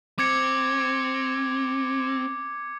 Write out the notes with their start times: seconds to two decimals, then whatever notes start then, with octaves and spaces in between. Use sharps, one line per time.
0.19 C4 D6 G#6 C#7